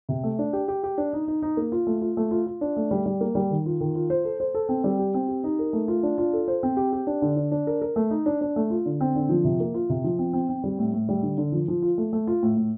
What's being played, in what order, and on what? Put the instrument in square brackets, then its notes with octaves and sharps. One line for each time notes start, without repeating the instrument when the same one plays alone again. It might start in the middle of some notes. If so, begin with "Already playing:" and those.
[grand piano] C3
A3
D4
G4
G4
G4
D4
D#4
D#4
D#4
A#3
F4
A3
F4
A3
F4
F4
D4
A3
G3
G3
A#3
G3
D#3
F4
D#3
F4
C5
A4
C5
A4
C4
G3
G4
C4
G4
D#4
A#4
A3
F4
D4
F4
A4
C5
C4
G4
G4
D4
D3
D4
D4
A#4
A#4
A3
D#4
D4
D4
A3
F4
D3
C4
D3
F3
C3
A#3
F4
C3
F3
C4
C4
C4
G3
A2
A2
G3
D3
D3
F3
F3
F4
A3
A3
F4
A2
A2